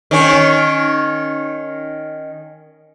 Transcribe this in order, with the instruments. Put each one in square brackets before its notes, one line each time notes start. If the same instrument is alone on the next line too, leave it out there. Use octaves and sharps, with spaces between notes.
[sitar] D#3 C#4